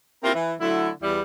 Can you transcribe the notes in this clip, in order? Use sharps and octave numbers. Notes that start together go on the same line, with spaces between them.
A#3 C4 E4 F4 G4 A#4
E3
D3 F#3 A3 E4
E2 G3 E4